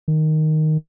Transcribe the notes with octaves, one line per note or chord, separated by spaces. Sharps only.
D#3